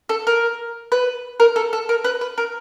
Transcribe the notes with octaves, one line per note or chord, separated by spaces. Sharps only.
A4
A#4
B4
A#4
A4
A4
A#4
B4
B4
A#4